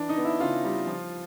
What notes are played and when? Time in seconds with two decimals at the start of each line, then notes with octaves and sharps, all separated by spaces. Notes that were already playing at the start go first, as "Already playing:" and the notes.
Already playing: E3 D4
0.09 D#4
0.17 B3
0.25 E4
0.40 C#3 F4
0.64 G3
0.87 F3